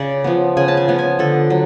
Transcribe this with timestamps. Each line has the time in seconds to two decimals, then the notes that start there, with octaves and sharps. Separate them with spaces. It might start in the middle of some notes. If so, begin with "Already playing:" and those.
Already playing: C#3 D5
0.24 F3 B3
0.57 C#3 G#5
0.68 A5
0.77 G#5
0.88 F3 B3
0.99 G#5
1.19 D3 A4
1.50 F#3